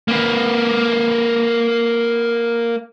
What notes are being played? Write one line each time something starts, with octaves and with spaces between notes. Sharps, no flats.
A#3 B4